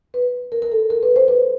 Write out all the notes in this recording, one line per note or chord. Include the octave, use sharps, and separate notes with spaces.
B4
A#4
A#4
A4
A#4
B4
C5
B4